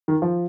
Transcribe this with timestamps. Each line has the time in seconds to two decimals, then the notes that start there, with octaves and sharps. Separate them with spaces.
0.08 D#3
0.22 F3